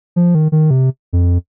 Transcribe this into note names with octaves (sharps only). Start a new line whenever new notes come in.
F3
D#3
D#3
C3
F2